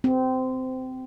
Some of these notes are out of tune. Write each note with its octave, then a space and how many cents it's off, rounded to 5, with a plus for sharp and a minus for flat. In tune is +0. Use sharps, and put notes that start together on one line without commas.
C4 -20